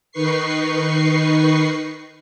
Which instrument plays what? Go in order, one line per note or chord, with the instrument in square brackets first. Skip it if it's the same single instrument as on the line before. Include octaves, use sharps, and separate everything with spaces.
[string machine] D#3 D#4 B4 C#6 C7